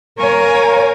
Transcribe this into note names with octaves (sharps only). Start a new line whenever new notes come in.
A#4 C#5 F5 G#5 A#5